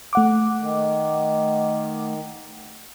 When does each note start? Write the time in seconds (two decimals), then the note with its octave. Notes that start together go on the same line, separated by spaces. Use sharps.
0.13 A3 F#5 D6
0.59 D#3